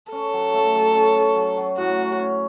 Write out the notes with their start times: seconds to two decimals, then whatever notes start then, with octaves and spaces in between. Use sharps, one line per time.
0.12 C#4 A4
0.33 F#3
0.54 A3
0.75 F#3
0.95 C#4
1.16 C#4
1.36 F#3
1.57 F#3
1.78 A2 F#4
1.98 C#4
2.19 C#4